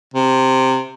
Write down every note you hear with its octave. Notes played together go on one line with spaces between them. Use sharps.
C3